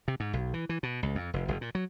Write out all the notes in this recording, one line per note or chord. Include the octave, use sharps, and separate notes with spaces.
C3
G#2
B1
E3
E3
B2
C#2
F2
F1
F#1
A#2
F#3